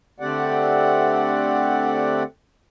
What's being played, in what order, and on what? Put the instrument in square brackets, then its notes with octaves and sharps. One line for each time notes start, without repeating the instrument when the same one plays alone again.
[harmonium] D3 A3 C4 G4 D5 F#5